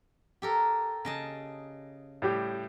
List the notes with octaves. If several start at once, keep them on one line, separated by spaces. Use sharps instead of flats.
G4 A4 A#4
C#3 D#5 A5
A2 G3 G4